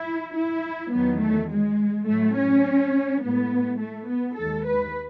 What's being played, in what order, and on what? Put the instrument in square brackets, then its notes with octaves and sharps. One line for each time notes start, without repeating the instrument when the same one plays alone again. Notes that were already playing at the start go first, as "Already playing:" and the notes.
Already playing: [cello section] E4
E4
E2 D#3 F#3 B3
A3
G#3
A2 F#3 A3
C#4
A2 G#3 B3
A3
B3
D#2 D#3 G#3 A4
B4